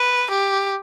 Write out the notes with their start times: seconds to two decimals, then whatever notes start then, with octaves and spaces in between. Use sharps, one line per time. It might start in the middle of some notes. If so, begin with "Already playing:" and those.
Already playing: B4
0.30 G4